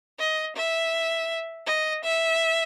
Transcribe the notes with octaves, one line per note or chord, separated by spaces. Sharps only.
D#5
E5
D#5
E5